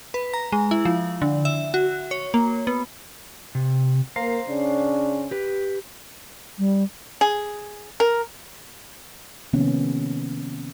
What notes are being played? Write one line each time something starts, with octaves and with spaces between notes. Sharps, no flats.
B4
A#5
G#3
E4
F3
D3
E5
F#4
C#5
A#3
B3
C3
A#3 C5 F5 A#5
C#3 C#4 D4
G4 B4
G3
G#4
A#4
C3 D#3 F3 A#3 B3 C#4